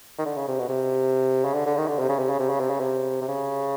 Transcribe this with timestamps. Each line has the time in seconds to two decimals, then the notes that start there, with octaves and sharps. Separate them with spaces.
0.19 D#3
0.26 D3
0.37 C#3
0.48 C3
0.59 B2
0.69 C3
1.45 C#3
1.55 D3
1.66 D3
1.77 D#3
1.88 D3
1.99 C3
2.09 C#3
2.19 C3
2.29 C#3
2.39 C3
2.49 C#3
2.60 C3
2.70 C#3
2.80 C3
3.21 C3
3.28 C#3